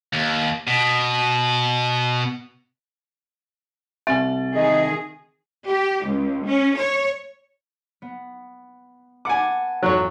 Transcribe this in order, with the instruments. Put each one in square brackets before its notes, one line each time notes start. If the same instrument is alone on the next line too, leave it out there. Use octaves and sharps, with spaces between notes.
[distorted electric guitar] D#2
B2
[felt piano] C2 A6 [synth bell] E5 G#5
[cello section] D#3 G#4 [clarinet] D#5
[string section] G4
C#2
C#4
C#5
[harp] B3
[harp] B4 F#5 A5 [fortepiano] G#5 D6
[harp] A1 F2 G#2 [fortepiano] F#3 C#5